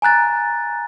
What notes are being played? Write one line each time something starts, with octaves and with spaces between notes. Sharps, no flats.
G#5 A#5 F#6 A6